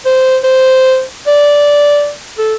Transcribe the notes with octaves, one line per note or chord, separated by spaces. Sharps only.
C5
C5
D5
A4